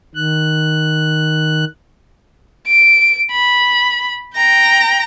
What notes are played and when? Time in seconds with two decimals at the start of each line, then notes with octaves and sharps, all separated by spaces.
0.15 D#3 F#6
2.67 D7
3.32 B5
4.36 G5 A#5